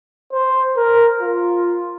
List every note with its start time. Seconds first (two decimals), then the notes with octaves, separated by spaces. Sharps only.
0.33 C5
0.77 A#4
1.21 F4